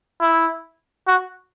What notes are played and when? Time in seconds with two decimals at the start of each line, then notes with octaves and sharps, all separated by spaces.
0.21 E4
1.07 F#4